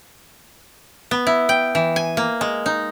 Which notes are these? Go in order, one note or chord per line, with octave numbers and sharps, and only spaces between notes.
B3
E4
G5
E3
G#5
A#3
G#3
D#4